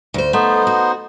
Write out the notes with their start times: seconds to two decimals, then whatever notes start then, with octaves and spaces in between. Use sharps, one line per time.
0.14 D2 C5
0.33 A3 B3 D#4 C5
0.67 F#4